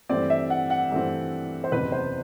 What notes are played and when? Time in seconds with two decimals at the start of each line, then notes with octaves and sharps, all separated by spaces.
0.09 G2 E3 A3 C4 D5
0.30 E5
0.50 F#5
0.70 F#5
0.91 G2 E3 A3 C4
1.64 C5
1.72 F#1 E2 C3 B4
1.92 C5